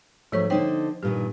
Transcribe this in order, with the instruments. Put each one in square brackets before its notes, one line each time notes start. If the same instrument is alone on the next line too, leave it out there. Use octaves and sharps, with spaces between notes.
[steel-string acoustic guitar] G#2 F#3 A3 [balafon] F3 C#5 C#6
[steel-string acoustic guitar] D3 D#4 C5 [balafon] C#5 G5
[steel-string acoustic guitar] G2 A#2 D#3 [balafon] G4